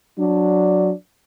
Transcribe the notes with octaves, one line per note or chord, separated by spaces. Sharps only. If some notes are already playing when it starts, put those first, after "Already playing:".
F#3 D4